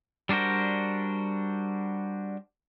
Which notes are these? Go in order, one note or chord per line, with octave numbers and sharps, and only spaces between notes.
G3 D4 F#4 A#4 C5